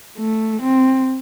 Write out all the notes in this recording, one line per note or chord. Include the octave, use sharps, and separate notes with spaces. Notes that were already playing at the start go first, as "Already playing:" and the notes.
A3
C4